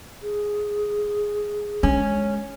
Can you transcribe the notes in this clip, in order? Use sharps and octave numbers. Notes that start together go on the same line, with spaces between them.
G#4
G#3 C#4